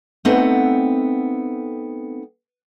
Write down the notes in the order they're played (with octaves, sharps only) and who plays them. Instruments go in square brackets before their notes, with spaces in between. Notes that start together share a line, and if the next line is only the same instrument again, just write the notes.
[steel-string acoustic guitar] A3 B3 C4 D#4 A4 F#5